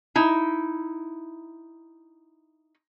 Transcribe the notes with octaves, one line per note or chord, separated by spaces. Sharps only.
D#4 E4